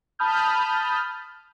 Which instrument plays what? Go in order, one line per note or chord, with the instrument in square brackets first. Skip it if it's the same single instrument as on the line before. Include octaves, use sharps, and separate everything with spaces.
[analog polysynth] A5 B5 D#6 F6 G6